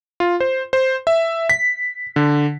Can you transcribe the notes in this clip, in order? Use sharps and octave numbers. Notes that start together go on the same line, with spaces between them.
F4
C5
C5
E5
B6
D3